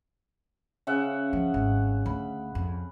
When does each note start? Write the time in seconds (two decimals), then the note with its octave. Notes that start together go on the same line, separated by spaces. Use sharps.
0.87 C#3 E5 F#5
1.33 F3
1.54 G#1
2.06 D2 B5
2.55 F2